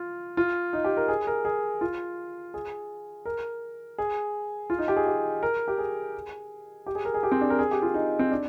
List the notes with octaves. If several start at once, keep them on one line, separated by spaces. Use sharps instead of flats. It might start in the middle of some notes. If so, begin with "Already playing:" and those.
Already playing: F4
F4
D#4
G4
A#4
G#4
A#4
G#4
F4
G#4
A#4
G#4
F4
D#4
G4
G#4
G4
A#4
G4
G#4
G4
G#4
A#4
G#4
G4
C4
D4
A#4
G#4
G4
F4
D#4
C4
D4